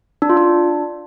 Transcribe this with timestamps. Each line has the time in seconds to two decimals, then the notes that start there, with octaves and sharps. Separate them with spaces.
0.22 D4
0.29 F4
0.37 D4